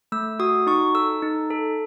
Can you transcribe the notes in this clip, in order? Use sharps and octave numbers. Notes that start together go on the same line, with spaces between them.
A3 E6
F#4 D#6
D#4 C#6
A4 E6
D#4
A4